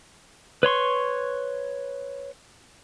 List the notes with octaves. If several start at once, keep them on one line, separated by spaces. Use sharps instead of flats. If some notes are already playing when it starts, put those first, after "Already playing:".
B4 C#5 C6 C#6